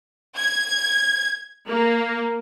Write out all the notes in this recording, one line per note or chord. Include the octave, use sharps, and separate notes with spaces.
G#6
A#3